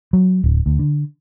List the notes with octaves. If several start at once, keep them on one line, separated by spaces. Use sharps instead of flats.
F#3
D1
D2
D3